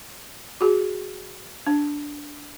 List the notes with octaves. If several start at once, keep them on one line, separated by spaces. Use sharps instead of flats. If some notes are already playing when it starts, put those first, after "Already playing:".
F#4 G#4
D4